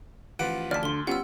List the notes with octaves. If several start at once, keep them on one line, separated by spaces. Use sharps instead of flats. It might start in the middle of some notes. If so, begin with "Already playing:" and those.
A1 F3 F4 B4 F#5 D6
D2 D5 A5 F6 B6
D3 C6 G7
G3 B3 C#4 F4 F#5 E6